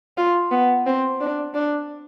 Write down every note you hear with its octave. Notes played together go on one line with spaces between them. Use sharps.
F4
B3
C4
D4
D4